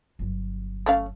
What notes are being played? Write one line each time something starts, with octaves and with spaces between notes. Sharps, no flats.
G1 F#3
A3 C#4 F5